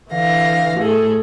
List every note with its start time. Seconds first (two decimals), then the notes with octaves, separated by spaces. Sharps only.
0.10 D3 E3 F5 A#6
0.78 A2 G#4 A4